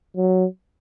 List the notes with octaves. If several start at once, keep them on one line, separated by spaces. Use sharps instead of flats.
F#3